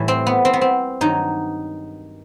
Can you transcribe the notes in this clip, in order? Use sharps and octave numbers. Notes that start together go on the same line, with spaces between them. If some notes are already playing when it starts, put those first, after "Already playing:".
Already playing: A2 E3 G3
C4
B3
C4
B3
C4
G2 D#3 F#3 D#4